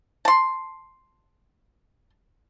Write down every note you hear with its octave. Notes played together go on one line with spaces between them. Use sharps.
A5 C6